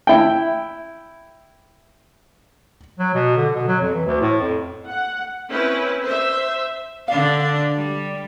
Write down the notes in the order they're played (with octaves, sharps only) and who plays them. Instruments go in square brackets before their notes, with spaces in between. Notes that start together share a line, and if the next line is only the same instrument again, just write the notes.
[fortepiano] E4 G5
[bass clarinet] F#3
B2
D3
B2
F#3
F2
E3
D2
A2
F2
[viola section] F#5
C4 C#4 E4 B4
C5 E5
[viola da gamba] D3 D4 [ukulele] F5
[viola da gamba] G3